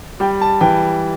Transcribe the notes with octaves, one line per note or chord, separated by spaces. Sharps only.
G3 G5
A5
E3 G5